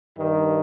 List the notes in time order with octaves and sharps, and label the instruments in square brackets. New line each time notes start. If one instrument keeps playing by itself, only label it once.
[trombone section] G2 D#3